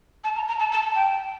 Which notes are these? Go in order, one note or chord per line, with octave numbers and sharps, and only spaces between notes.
A5
A#5
A#5
A5
A5
G5